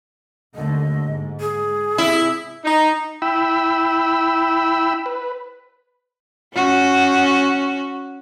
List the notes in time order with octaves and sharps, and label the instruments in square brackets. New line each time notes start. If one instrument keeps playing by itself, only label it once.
[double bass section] D#2 D3 A3 [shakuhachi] D#5
[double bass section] G#2
[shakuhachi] G#4
[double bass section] C3 [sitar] E4
[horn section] D#4
[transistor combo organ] E4 G5 B5 E6
B4
[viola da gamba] C#4 F#4